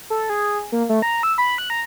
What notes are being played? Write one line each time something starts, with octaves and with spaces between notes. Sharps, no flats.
A4
G#4
A#3
A3
A#5
E6
B5
F#6
A#5